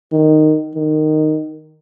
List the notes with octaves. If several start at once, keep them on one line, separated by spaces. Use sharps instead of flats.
D#3
D#3